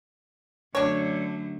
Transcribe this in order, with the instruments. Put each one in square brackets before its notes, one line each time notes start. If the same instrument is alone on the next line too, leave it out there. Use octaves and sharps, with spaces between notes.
[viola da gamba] F#2 D3 A3 [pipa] D4 C#5